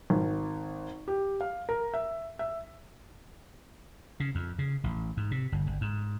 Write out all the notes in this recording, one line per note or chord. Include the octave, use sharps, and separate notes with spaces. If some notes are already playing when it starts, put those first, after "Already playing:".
G#1
G4
F5
A#4
E5
E5
C#3
F2
C#3
A1
G#2
C3
G1
G1
G#2